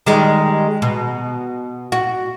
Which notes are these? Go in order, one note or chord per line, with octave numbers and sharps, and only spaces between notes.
D#3 G3 G#3
B2
F#4